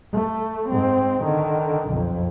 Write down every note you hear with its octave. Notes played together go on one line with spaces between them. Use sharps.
A3
G#2 C4
D3 D#3
B1 F2